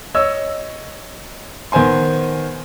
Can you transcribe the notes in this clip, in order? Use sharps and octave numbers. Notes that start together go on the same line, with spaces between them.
C#5 D#5 E6
D#3 B3 C5 G#5 C6